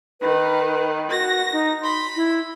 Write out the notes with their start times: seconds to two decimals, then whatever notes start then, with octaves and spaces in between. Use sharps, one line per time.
0.21 D#3 B4
1.11 F#4 A#6
1.52 D#4
1.82 B5 C6
2.16 E4